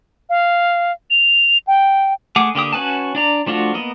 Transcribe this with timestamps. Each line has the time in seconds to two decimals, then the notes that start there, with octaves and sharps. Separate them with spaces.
0.29 F5
1.10 F7
1.67 G5
2.36 A3 G#4 F#5 D6
2.55 D3 A#3 G4 D#6
2.72 C#4 F#4 B4 G#5 A5
3.15 D4 D5 A#5
3.46 F3 A3 D4 F4 F#4
3.74 A#3 B3 D#5